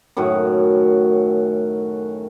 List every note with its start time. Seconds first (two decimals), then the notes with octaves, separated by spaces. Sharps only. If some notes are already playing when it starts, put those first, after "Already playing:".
0.17 F#2 A2 D#3 F#4